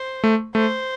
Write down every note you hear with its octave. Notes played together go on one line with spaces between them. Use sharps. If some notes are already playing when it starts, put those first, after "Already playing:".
Already playing: C5
A3
A3 C5